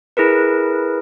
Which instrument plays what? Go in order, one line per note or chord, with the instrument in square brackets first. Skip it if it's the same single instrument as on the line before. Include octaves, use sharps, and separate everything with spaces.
[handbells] E4 G#4 A#4 B4